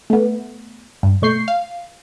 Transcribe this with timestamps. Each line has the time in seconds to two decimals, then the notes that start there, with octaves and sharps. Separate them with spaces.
0.10 A3 B3
1.03 G2
1.22 B2 A3 C#6 G6 C7
1.48 F5